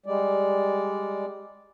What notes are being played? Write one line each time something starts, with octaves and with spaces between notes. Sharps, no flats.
G3 G#3 D5